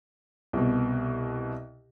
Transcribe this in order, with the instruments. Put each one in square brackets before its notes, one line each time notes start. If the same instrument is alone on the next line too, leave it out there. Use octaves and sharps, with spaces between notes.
[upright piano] C2 B2